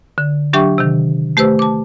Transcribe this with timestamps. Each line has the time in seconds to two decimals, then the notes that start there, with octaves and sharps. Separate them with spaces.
0.18 D3
0.53 F#3 D4 G4 E5 G5 C#6
0.78 C3 D#3
1.37 A3 G4 B4 C5 E6
1.59 A5 D6